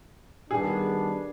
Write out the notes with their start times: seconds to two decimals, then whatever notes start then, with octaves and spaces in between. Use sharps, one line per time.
0.51 D#3 G3 B3 D4 G#4